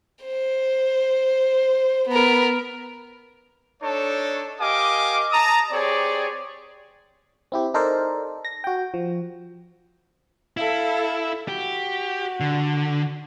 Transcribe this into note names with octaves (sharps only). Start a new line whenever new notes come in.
C5
B3 A#4
D4 D#4 A4 C#5
G4 A#4 D#5 F5 G#5 D6
A5 A#5 D#6
C4 G4 G#4 C#5 D5
C4 E4 G4
D#4 A4 A#4 C5 D5
A#6
F#4 G5
F3
E4 A4 F5
F#4 G4
D3